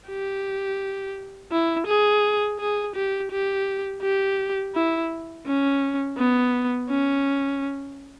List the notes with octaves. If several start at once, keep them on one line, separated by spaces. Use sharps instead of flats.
G4
E4
G#4
G#4
G4
G4
G4
E4
C#4
B3
C#4